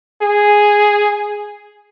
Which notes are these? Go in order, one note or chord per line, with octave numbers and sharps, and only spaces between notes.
G#4